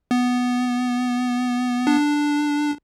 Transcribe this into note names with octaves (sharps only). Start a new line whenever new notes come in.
B3
D4